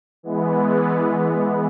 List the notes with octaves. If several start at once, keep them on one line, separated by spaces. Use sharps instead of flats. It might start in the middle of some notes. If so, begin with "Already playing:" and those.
E3 G#3 B3